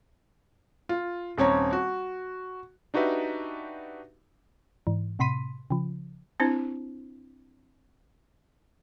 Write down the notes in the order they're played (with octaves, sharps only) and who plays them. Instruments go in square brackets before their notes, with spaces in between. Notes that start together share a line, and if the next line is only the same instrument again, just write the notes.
[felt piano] F4
D#1 C4 C#4 C#5 A#5
F#4
[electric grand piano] D4 D#4 F#4 G4 B4 E5
[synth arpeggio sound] G#2 E3
A2 C3 B5 C6 B6 D#7
C#3 F3
[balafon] C4 D4 E4 C5